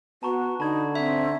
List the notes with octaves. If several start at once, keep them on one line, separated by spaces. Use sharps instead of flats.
B3 F#4 A5 A#5 C#6
D3 D#4 A5 B5 G#6
C4 E5 G#6